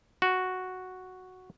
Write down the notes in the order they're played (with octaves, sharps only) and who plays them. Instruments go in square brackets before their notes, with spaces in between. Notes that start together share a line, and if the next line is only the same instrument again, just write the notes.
[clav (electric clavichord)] F#4